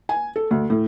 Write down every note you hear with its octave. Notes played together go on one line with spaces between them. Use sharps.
G#5
A4
D2
A2